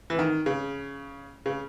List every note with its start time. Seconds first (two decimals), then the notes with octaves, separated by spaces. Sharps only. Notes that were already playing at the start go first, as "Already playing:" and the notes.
0.10 E3
0.19 D#3
0.46 C#3
1.46 C#3